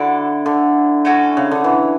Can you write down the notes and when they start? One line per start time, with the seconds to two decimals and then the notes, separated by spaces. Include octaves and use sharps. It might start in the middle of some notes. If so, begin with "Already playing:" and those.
Already playing: D3 D4 E4 F#4 A4
0.46 D3
1.05 A3 C#4 F#4 A4
1.37 C#3
1.51 D3
1.64 E3